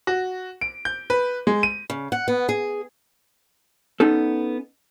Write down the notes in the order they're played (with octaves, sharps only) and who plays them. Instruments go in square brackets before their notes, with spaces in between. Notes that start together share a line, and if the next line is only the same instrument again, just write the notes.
[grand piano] F#4
D7
G6
B4
G#3
D#7
[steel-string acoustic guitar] C#3
F#5
B3
G#4
[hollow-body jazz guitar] B3 C#4 D#4 A4